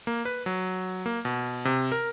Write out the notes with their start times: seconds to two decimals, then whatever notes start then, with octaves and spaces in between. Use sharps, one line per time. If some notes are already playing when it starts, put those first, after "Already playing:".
0.07 A#3
0.25 B4
0.46 F#3
1.06 A#3
1.25 B2
1.65 C3
1.92 A#4